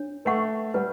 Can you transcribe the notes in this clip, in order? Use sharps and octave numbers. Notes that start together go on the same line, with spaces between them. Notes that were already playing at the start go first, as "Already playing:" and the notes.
Already playing: D4 C#5
A3 B4 F#5 C#6
G3 B4 F#5